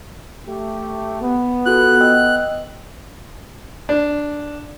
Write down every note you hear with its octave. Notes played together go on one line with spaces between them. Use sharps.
A3 G4
B3
F4 F#4 A4 F#6
D#5 G5 E6
D4